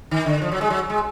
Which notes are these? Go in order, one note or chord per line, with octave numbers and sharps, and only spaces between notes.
D#3
D3
F3
F#3
G#3
F#3
G#3